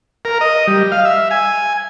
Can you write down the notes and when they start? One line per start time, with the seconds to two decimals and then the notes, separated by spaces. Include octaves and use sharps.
0.25 A#4
0.41 D#5
0.67 G3
0.92 F5
1.05 E5
1.31 G#5